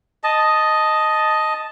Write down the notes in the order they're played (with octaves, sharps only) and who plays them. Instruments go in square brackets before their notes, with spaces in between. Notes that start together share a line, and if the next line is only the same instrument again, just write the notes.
[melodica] D#5 A5